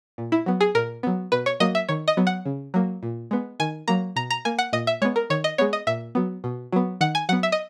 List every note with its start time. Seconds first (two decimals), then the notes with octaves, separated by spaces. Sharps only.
0.18 A#2
0.32 E4
0.46 F#3 B3
0.61 G#4
0.75 A#2 A#4
1.03 F#3 B3
1.32 B2 B4
1.46 C#5
1.60 F#3 A#3 D#5
1.75 E5
1.89 D#3 C#5
2.08 D#5
2.17 F#3 B3
2.27 F#5
2.45 C#3
2.74 F#3 A#3
3.03 A#2
3.31 G#3 B3
3.60 D#3 G#5
3.88 F#3 A#3 A#5
4.16 B2 A#5
4.30 A#5
4.45 A#3 G#5
4.59 F#5
4.73 A#2 D#5
4.87 E5
5.02 G#3 B3 C#5
5.16 A#4
5.30 D#3 C#5
5.44 D#5
5.58 G#3 B3 C#5
5.73 D#5
5.87 A#2 E5
6.15 F#3 B3
6.44 B2
6.72 F#3 B3
7.01 D#3 F#5
7.15 G#5
7.29 F#3 B3 F#5
7.43 E5
7.52 D#5